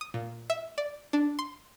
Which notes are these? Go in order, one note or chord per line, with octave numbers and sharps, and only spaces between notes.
D#6
A#2
E5
D5
D4
C6